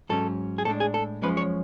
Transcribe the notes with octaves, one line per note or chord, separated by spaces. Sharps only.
G#2 F#3 C#4 A4
G#4
A2 G#3 D4 A4
G#4
A4
F#2 F3 G#3 C#4 B4
C#5